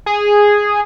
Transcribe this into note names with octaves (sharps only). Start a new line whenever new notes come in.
G#4